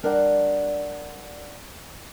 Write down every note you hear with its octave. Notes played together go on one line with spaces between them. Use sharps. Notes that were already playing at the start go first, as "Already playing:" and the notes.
G3 D4 A#4 D5 F#5 A#5